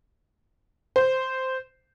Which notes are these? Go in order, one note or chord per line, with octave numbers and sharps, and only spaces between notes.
C5